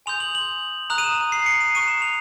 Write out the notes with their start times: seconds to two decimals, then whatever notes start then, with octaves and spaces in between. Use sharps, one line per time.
0.06 G#5 C6 D#6 G6 F7
0.20 F#7
0.35 F#7
0.90 A#5 D#6 F#6 F7
0.98 D#7
1.04 E7
1.32 C7
1.46 C#7
1.61 D#7
1.74 A#5 C#6 F#6 D#7
1.88 E7
2.02 F7